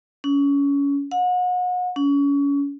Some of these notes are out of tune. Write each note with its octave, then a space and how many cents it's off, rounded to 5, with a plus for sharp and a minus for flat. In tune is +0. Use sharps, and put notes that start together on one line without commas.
C#4 +25
F#5 -35
C#4 +30